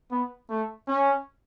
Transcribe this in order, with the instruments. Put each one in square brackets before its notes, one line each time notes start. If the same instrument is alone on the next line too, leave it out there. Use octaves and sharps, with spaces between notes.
[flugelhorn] B3
A3
C#4